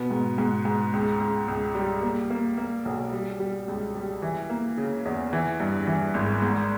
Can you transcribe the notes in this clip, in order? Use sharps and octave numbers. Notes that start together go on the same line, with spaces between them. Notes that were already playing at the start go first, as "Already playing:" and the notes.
Already playing: B2 B3
G#2
G#2
G#2
C#2
C#2
C#2
G3
A#3
A#3
A#3
B1
G3
G3
C#2
G3
E3
A#3
C#3
E2
E3
G2
E3
G#1
G#2